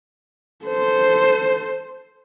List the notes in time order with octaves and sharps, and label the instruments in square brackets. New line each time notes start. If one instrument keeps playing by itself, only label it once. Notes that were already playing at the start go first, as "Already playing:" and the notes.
[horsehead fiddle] A4 C5